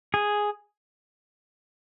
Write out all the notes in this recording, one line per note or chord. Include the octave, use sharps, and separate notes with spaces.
G#4